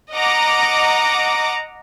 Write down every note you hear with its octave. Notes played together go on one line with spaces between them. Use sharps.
D#5 F#5 A#5 D6